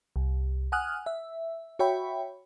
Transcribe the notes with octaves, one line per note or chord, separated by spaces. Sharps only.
C2
F#5 G#5 D#6 F6 F#6
E5
F#4 C#5 E5 G5 B5